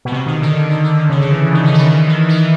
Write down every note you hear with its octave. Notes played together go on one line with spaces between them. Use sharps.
B2
C3
D#3
D3
D#3
D#3
D#3
D3
C#3
D3
E3
D#3
C#3
D#3
D#3
E3
D#3